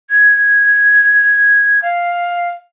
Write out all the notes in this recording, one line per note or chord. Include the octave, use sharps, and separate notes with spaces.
G#6
F5